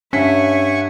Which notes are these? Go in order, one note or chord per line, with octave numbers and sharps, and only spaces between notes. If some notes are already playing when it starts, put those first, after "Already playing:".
G2 C#4 C#5 E5 F#5 G#5 C#6 B6